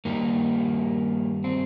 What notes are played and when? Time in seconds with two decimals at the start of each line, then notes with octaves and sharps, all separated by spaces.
0.05 G2 D#3 G3 A#3
1.44 C4